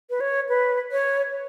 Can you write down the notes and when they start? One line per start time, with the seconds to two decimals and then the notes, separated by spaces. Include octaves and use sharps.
0.10 B4
0.20 C#5
0.49 B4
0.92 C#5